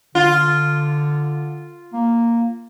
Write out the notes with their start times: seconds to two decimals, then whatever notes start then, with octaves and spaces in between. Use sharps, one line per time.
0.15 D3 F4
1.93 A#3